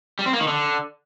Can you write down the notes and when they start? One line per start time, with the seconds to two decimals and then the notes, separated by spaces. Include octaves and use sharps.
0.19 G3
0.26 C4
0.33 A#3
0.40 D#3
0.48 D3